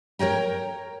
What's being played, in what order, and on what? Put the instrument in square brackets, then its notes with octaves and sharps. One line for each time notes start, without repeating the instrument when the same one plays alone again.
[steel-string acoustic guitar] A#4 C#5 G5 A#5